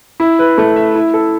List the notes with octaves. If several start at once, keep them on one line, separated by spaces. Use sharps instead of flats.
E4
B4
A3
E5
E4
A4